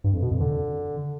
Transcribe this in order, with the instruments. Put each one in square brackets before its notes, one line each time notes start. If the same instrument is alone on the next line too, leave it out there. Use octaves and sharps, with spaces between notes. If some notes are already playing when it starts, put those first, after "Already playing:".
[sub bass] G2
F2
B2
F2
D3